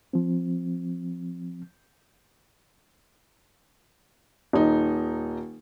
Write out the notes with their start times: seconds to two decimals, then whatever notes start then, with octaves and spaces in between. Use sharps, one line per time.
0.13 F3 C4
4.53 D#1 D#4